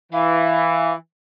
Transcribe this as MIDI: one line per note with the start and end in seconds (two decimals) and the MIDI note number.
0.13 0.93 52
0.13 0.93 77